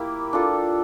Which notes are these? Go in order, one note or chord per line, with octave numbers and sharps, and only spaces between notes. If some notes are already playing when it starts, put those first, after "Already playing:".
Already playing: A#3 E4 G4
D4 F4 A4